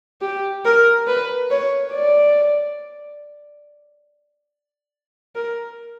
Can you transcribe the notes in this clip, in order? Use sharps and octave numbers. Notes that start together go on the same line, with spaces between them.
G4
A#4
B4
C#5
D5
A#4